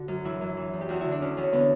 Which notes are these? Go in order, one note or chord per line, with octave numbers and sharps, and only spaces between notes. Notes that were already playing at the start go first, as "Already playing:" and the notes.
Already playing: D3 F#4
F#2
E3 E4
F#2
E3
E2
G4
E2 F#4
D3 E4
D4
E2 C#4
E2 C#4
D3 B3